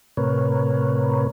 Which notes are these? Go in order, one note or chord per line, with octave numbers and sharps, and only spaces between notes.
A2 C3 A#4 B4 C#5